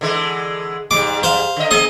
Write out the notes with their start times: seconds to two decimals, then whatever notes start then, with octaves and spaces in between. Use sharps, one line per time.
0.01 D3 E3 G#3
0.91 G#2 G3 D6
1.23 C5 F5
1.56 D3 D#5
1.71 A#3 G#4 D#5